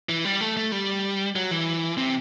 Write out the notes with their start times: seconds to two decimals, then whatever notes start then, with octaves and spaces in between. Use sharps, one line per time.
0.09 E3
0.25 G3
0.41 A3
0.57 A3
0.72 G3
1.36 F#3
1.51 E3
1.97 C3